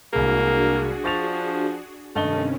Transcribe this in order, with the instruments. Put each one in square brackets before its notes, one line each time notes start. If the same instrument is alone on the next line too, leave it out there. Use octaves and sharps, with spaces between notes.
[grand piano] C2 G#3 [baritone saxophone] A#3 [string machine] D4 F#4 G#4
[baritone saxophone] F3 [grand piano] C#6 A6 F7
[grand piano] G2 D#5 G7 [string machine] C3 D#3 C#4 [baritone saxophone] A3